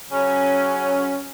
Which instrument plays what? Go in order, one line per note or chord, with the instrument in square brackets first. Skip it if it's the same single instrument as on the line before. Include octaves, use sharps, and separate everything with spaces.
[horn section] C#3 F#3 C#4